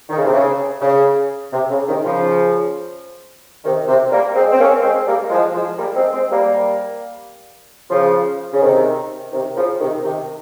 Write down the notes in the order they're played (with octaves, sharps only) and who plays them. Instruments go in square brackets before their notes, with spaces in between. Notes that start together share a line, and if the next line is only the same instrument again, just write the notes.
[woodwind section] D#3
C#3
C3
C#3
C#3
C3
C#3
C3 D#3
C#3 F3
C3 D#3
C3
G3 A#3
G#3 C4
C4
A#3 C#4
G#3 C4
G3 A#3
F3 G#3
F3 G#3
G3 A#3
G#3 C4
G#3 C4
G3 A#3
C#3 F3
C#3
C3 D#3
C3 D#3
C#3 F3
C3 D#3
C3 D#3